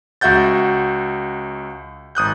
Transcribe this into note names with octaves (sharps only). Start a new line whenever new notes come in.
C#2 F#4 E5 F#5 G6 A6
G#1 D#6 F#6 G6